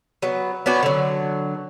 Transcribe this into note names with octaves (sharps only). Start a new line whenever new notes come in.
F#3 B3
B3 C#4 D4 F#4
D3 F#3